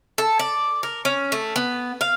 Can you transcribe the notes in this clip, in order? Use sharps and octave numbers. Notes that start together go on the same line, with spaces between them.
A4
D5
A#4
C#4
A3
B3
F5